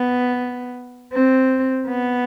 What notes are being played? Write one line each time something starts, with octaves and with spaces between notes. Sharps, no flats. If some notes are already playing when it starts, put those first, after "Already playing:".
Already playing: B3
C4
B3